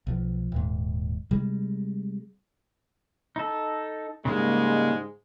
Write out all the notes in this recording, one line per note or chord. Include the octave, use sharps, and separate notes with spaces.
B1 F3
D#1 G#2
C3 G3 G#3
D#4 A4
G#2 C#3 G3 G#3 A#3